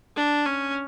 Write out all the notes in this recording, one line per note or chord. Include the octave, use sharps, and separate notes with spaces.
D4
C#4